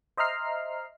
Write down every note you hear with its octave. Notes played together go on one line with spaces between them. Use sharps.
C5 D#5 E5 A#5 F6 C7